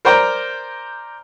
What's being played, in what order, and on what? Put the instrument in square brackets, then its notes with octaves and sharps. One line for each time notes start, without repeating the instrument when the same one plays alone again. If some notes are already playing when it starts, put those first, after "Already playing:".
[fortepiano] A#4 C5 D5 G5 A#5